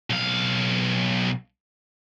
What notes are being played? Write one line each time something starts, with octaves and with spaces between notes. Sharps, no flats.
B1 F5